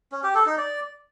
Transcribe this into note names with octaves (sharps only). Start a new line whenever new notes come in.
C#4
G4
A4
D#4
D5